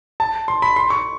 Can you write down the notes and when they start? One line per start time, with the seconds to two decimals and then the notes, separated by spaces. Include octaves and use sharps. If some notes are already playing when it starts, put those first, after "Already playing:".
0.20 A5
0.48 C6
0.62 B5
0.76 C6
0.90 C#6